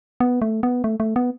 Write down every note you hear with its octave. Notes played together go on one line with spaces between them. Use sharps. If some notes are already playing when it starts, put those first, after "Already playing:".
B3
A3
B3
A3
A3
B3